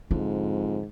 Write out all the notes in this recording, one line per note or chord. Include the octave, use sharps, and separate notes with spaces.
F2 G#2 D3